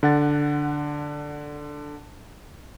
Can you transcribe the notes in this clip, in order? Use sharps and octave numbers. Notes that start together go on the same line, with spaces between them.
D3 F#5 A6